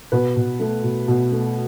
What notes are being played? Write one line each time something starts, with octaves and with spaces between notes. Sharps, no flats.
B2 B4
B2
A3
B2
B2
A3